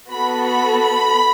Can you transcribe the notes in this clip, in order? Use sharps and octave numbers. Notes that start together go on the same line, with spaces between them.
B3 F#4 A4 B5
B5
B5